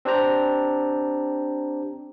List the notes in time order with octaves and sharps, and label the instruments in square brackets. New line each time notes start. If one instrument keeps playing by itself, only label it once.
[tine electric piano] C4 D4 G4 C5 A#5